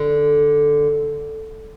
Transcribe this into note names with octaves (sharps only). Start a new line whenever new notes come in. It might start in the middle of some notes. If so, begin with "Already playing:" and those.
Already playing: D3